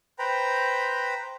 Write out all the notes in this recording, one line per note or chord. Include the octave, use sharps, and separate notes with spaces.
B4 C5 G5 A#5 B5